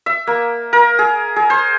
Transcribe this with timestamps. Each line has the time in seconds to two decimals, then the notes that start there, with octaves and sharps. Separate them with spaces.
0.06 E5
0.27 A#3
0.73 A#4
0.99 G#4
1.36 G#4
1.50 C5